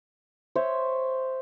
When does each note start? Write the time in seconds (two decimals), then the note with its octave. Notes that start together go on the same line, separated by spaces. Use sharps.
0.56 C5 C#5 E5